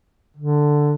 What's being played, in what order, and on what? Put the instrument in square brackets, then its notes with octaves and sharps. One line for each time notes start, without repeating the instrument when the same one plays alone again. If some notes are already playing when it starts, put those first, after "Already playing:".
[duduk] D3